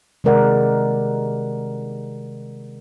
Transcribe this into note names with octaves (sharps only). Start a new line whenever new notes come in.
C3 D#3 G#3 A#4 D5 F#5